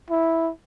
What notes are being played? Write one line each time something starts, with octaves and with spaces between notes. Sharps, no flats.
E4